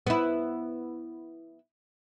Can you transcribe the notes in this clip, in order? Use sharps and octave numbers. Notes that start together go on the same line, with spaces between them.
B3 E4